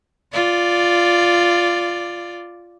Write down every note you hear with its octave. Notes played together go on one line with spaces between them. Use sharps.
F4 D5